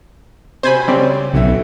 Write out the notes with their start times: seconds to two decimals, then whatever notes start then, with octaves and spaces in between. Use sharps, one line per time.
0.63 C3 F#4 C5 G#5 B5
0.88 C#3 G3 C4 C#5 D5
1.33 B1 F#4 A4 E5